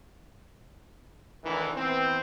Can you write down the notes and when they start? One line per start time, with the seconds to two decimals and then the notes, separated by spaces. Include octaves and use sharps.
1.43 D2 D#3 E3
1.76 E3 B3 C4